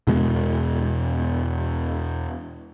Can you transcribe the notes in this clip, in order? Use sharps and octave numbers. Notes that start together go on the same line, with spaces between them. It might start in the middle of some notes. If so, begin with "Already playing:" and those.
E2 B2 G#3